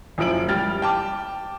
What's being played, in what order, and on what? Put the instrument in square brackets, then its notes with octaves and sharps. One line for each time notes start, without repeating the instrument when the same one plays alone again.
[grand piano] F#1 F3 E4 D7 F#7
G3 G5 F6 A6
G5 A5 D6